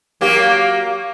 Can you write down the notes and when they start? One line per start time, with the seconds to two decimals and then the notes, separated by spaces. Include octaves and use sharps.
0.21 F#3 A#3 G4